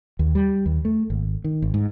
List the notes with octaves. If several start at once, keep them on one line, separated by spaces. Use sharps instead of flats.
D#2
G3
D#2
A3
G#1
D#3
G#1
G#2